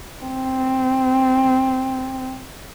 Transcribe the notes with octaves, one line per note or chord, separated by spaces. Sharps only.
C4